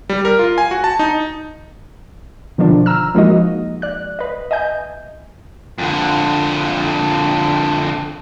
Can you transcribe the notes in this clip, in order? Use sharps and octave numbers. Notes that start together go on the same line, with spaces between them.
G3
A#4
F4
G#5
F#4
A5
D#4
B2 D3 D#3 F3 D4 F4
A#5 E6 F6
F3 G#3 A#3 D#4 F#4 D#5
D5 F#6
B4 D#5
D#5 E5 G#5 G6
F2 D3